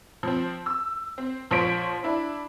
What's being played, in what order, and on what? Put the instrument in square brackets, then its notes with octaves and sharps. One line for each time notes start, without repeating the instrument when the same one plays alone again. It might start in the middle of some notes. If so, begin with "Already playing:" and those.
[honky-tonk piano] F3 C4
E6
C4
A#1 F3 C5 C#5 B6 D7
D4 E4